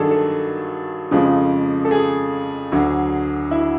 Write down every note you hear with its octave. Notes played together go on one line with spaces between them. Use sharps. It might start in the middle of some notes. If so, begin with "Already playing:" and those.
Already playing: G2 D#3 F#3 D4 G#4 A4
A4
F2 C#3 F3 G#3
A4
G#4
D2 D3 F#3
E4